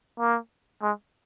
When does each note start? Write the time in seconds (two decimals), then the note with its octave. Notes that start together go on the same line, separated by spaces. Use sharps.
0.19 A#3
0.82 G#3